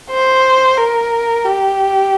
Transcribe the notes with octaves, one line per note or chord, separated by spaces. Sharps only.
C5
A#4
G4